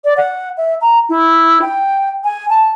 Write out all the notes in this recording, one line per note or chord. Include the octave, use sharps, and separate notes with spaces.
D5
F#5
E5
A#5
E4
G5
G#5
A5